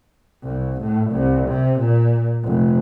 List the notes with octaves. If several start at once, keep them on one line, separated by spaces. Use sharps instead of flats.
C2
A2
C2
C3
A#2
F1